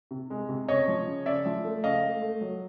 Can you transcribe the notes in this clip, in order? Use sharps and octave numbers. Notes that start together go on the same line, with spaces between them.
C3
G#3
C3
C#3 C#5 D#5
F3
C#3
C#3 D5 E5
F3
A3
C#3 D#5 F5
A3
A3
F#3